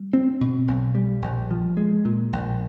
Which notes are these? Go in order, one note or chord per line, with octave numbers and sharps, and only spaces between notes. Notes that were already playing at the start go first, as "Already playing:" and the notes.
Already playing: G3
C4
B2
B1
G3
A#1
F3
G#3
A#2
A#1